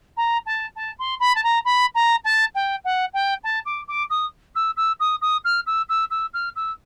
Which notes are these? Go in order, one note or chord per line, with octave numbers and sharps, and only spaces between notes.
A#5
A5
A5
C6
B5
A5
A#5
B5
A#5
A5
G5
F#5
G5
A5
D6
D6
D#6
E6
E6
D#6
D#6
F6
E6
E6
E6
F6
E6